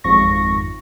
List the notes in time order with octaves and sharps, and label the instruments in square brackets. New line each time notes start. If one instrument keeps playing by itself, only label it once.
[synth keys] G#1 F2 C#6 A#6